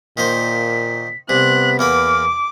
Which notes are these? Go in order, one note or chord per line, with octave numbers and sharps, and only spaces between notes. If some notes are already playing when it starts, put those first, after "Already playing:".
A#2 D#3 A#3 C5 B6
C2 C3 B3 F#6 B6
E2 A#3 B5 D6 F6